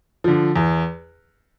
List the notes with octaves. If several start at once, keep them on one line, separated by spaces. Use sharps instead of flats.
D3 F3
E2